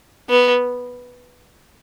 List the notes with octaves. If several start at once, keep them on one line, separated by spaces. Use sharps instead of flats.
B3